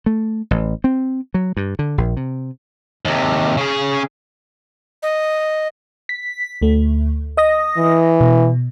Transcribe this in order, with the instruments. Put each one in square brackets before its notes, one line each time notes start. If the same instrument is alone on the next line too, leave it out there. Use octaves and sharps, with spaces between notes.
[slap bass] A3
A1
C4
F#3
G2
D3
A#1
C3
[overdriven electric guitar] D#2 C3
C#3 G#4
[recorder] D#5
[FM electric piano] B6
D2 A3
D#5 D#6 A#6
[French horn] E3
[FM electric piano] B2